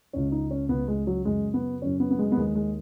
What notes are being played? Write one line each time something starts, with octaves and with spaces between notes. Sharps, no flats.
C#2 C#3 C#4
D#4
C#4
C#2 C#3 B3
G#3
F#3
F#2 C#3 G#3
B3
F#2 C#3 C#4
B3
B3
G#3
B3
D#2 D#3 G#3
G#3